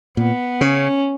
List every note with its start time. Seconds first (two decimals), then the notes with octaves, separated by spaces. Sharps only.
0.17 A#2 B3
0.60 C#3 C#4